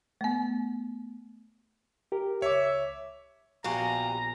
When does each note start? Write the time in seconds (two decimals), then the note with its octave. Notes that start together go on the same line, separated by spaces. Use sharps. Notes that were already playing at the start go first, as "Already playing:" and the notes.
0.21 A3 B3
2.12 G4 A#4
2.42 C#2 C#5 E5 D6
3.64 A#1 B3 F#4 G4 F5 G#5 A#5